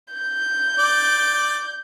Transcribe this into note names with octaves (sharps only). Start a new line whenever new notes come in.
G6
D5